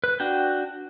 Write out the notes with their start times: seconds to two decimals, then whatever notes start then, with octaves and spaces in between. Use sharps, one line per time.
0.04 B4
0.20 D4 F#4 G5